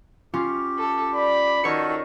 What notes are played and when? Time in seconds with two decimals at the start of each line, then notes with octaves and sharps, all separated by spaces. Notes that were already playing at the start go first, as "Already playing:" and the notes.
0.34 C#4 F4 G4
0.78 A4
1.14 D5 B5
1.64 D#3 F#4 A4 C#5 C#7